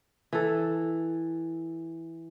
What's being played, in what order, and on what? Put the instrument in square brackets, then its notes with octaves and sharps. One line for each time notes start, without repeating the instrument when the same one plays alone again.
[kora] E3 A4